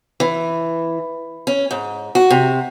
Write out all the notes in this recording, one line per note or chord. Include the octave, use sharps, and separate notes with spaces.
E3
C#4
G#2
F#4
C3